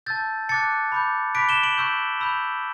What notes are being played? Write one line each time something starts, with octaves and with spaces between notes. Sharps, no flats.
A5 E6 G6 A6
A5 D6 F#6 A6 C#7
B5 D6 G6
B5 D6 F#6 B6 D7
E7 G7
D7 F#7
C#6 E6 G6
B5 E6 G6